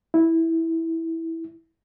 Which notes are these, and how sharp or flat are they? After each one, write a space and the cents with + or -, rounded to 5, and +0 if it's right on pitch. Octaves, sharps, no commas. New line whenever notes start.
E4 -10